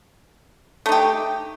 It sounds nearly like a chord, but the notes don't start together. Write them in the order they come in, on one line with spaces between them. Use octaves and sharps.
A3 D#4 G4